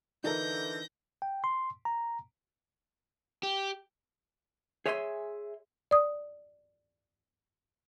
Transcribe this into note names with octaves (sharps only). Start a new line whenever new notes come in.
D3 E3 D#4 A4 A#4 G6 A#6
G5
C6
A#5
G4
G#4 C#5 E5 G#5 B5 C6
D5 D#6